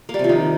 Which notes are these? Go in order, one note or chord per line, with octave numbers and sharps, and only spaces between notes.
A#3
G3
C3
F3
D#3